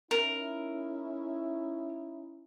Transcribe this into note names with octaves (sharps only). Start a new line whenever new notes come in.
C#4 D#4 E4 A#4